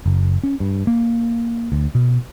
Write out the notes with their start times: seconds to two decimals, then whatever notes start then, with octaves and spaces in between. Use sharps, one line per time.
0.06 F#1
0.44 C#4
0.60 G2
0.87 A#3
1.72 D2
1.95 B2